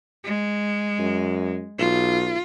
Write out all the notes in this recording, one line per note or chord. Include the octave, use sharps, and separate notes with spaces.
G#3
F#2
B1 F4